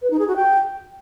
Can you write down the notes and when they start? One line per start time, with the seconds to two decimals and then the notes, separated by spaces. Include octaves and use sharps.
0.02 B4
0.11 D#4
0.19 G#4
0.28 F#4
0.36 G5